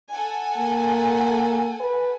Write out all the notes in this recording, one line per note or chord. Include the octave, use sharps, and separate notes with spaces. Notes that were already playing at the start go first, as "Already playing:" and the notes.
A4 F#5 G#5
A#3
B4